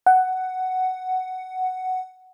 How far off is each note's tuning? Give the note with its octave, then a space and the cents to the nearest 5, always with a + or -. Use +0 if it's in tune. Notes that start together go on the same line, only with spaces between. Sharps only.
F#5 +10